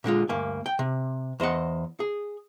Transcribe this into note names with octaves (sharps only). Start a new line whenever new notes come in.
A#2 D3 G#3 F4
D2 G2 A#3 G#5
G5
C3
E2 C5 D#5 F#5
G#4